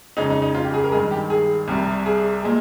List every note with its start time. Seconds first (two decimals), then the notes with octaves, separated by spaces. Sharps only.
0.17 F2 C#3 G#3 D#4
0.30 D#4
0.42 D#4
0.55 F4
0.64 G4
0.74 G#4
0.84 A#4
0.92 G2 D#3 G#3 G#4
1.11 G4
1.30 G#4
1.68 C2 C3 G3
2.06 G#4
2.43 A#2 G#3